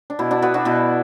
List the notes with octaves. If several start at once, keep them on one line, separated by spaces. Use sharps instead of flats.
D4
B2 E4
D4 F#4
B3 F#4 B4
D4 F#4
B2 E4